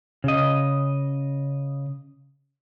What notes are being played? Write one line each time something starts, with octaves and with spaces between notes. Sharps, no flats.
C#3 D#5